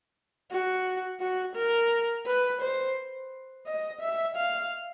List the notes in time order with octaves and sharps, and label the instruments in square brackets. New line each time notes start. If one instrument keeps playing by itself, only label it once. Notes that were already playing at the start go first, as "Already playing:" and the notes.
[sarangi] F#4
F#4
A#4
B4
C5
D#5
E5
F5